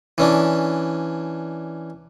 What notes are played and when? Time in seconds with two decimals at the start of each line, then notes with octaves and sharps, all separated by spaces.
0.18 E3 C#4 D4